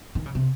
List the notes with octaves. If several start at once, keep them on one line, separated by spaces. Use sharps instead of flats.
D#3
C#3
C3